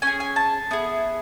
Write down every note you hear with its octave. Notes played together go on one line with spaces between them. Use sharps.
C#4 G#4 G#5
G#5
A5
B3 E4 G#4